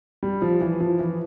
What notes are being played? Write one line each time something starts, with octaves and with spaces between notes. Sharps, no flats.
G3
F3
E3
F3
E3